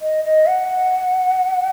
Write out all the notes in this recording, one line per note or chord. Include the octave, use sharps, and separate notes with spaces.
D#5
D#5
F#5